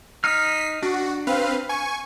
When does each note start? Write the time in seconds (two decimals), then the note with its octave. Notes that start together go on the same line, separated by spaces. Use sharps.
0.24 D#4 F6 B6 C7
0.82 D4 F#4
1.27 C4 B4 F5
1.69 G#5 C#6